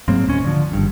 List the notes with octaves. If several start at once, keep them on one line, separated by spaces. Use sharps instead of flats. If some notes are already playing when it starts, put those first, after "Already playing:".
G#2 F#3 A#3 C4
D#1 C#2 C4 C#4
D3 F3
G#1 G2